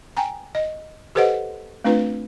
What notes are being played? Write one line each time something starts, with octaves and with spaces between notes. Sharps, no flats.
G5 G#5 A#5
D#5
G4 A4 B4 C5 D#5 F#5
A3 C4 D4 F4 B4